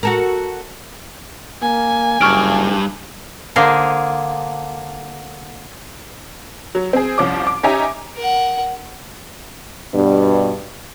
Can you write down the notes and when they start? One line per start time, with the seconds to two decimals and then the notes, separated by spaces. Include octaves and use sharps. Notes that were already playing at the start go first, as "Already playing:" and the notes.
0.03 F#4 A4 A#4
1.62 A#3 G#5
2.21 F#1 G2 C#6 F6 D7
3.56 D3 A#3 G#4 A#4 C5
6.75 F#3
6.93 C4 G#4
7.18 C2 F3 C#4 D6
7.47 D6
7.63 C#4 D#4 G4 E5 G#5 A#5
8.16 A#4 F#5
9.94 G2 B2